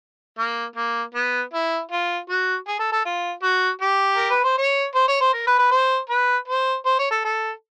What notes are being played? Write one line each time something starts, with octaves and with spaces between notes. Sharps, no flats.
A#3
A#3
B3
E4
F4
F#4
G#4
A4
A4
F4
F#4
G4
A#4
B4
C5
C#5
C5
C#5
C5
A#4
B4
B4
C5
B4
C5
C5
C#5
A4
A4